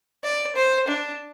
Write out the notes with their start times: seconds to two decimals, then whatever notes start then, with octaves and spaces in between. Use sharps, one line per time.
0.24 D5
0.56 C5
0.88 D4